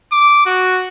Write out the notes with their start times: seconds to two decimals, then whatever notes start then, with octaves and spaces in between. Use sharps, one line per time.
0.12 D6
0.46 F#4